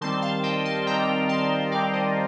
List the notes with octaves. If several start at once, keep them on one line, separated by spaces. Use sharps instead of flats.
D#3 G3 C4 A5 C6
F5 A5
D#5 G5
A5 C6
D#3 G3 C4 G5 A#5
A5 C6
D#3 G3 C4 D5 F5
C5 D#5